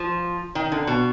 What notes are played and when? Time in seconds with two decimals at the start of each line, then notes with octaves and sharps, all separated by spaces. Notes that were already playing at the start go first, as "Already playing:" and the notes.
Already playing: F3
0.55 D#3
0.72 D3
0.87 B2